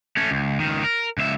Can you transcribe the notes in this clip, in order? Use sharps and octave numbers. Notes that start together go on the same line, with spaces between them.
A3 C#4
C#2
C#2 D#3
A#4
C#2 E5